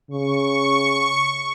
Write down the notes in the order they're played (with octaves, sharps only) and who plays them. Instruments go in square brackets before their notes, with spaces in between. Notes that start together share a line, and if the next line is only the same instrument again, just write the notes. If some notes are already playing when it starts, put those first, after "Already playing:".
[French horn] C#3 [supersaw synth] C#6